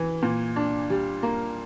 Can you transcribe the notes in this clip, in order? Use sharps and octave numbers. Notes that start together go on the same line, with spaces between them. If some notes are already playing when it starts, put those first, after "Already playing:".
Already playing: E3
A#2
D4
G3
A#3